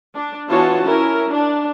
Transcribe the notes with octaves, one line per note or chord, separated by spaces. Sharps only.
D4
E3 B3 F4 F#4 C#5 A5
C#4 E4 A#4
D4